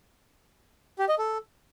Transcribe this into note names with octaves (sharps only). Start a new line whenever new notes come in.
G4
D#5
A4